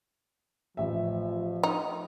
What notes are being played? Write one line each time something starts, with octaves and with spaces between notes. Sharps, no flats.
A1 F3 E5
D#4